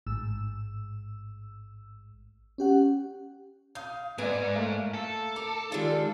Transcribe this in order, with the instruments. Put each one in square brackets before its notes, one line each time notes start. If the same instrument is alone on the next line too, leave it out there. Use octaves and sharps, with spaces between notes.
[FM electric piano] A1 G#2 E6
C#4 G4 F#5
[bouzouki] F5 [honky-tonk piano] D#6 G6
[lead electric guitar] G#2 [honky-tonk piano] B3 D5 [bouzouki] G#5
[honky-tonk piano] A3 A#3 F5
[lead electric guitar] A4
[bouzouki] A#4 [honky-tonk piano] D6
[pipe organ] D#3 G#3 F4 [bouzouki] G3 D4